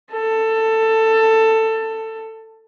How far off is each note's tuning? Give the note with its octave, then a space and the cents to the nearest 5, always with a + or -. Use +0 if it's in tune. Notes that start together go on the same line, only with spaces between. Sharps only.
A4 +15